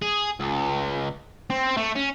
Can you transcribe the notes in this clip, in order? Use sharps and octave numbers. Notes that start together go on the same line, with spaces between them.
G#4
C#2
C4
A3
C#4